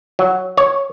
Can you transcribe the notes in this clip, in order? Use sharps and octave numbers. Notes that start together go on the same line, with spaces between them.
F#3
C#5